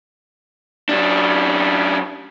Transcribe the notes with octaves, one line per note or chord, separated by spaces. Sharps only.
F#2 D4